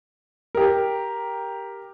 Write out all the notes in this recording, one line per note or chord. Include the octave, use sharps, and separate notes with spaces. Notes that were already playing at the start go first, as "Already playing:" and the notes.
G4 A#4